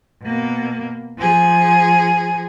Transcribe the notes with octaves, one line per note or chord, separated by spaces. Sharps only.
B2 A#3
F3 G#4